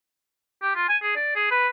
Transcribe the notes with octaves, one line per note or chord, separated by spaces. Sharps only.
G4
F4
G#5
G#4
D5
G#4
B4